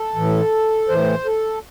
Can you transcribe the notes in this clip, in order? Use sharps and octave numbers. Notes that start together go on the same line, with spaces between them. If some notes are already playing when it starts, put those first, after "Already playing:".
Already playing: A4
A2 E3
A2 E3 C5
A4